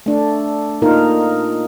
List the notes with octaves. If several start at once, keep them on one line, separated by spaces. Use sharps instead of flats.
A3 D4
A#2 D#4 F4 A#4